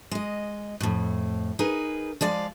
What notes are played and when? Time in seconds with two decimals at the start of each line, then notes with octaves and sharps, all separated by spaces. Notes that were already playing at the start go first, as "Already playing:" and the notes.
0.11 G#3 D#5
0.81 F2 A2
1.59 D#4 G#4 A#4 B4
2.21 F3 G#3 D5 F5